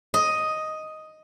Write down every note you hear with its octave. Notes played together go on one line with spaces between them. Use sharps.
D#5